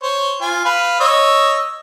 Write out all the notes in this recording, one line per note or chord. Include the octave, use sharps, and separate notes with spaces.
C5 C#5
F4 G#5
B4 F5
C#5 D#5 E6